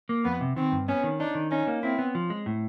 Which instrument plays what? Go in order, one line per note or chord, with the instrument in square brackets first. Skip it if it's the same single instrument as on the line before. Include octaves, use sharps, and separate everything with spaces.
[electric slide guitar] A#3
[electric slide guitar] F2 [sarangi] B3
[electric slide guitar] C3
[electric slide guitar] D#3 [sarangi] C4
[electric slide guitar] G2
[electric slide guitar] B3 [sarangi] C#4
[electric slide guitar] D#3
[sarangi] D4 [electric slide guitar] D#4
[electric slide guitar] D#3
[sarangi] C#4 [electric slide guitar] D#4
[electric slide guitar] A#3
[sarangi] C4 [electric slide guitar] E4
[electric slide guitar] B3
F3
G#3
A2